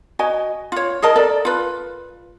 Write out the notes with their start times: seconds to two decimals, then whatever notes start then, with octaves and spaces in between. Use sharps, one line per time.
0.19 F#4 D#5 G#5
0.72 F4 C#5
1.02 G#4 A#4 D#5 A5
1.16 A4 A#4 D5
1.45 F4 B4